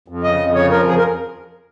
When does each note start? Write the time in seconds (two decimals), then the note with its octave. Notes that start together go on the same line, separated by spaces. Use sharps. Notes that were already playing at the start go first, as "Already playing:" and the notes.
0.08 F2
0.23 C#3 D#5
0.40 F2
0.55 C#3 C#5
0.70 F3 A#4
0.87 F2 G#4
0.97 A#4